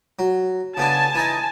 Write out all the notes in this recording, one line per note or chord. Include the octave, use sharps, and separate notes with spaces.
F#3
C#3 B3 D4 G#5 A5
E3 D#4 D#5